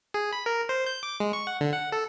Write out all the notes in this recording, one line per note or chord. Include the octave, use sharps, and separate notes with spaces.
G#4
B5
A#4
C5
G6
D6
G#3
C#6
F#5
D3
F#5
A4